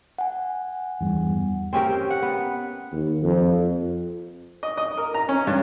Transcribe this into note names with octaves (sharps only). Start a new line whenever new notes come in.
F#5 G#5
E2 G2
C4 C#4 G4 A#4
F#5
B3
D#2
F2
D#5
D#5
A#4
A#5
C#4
G2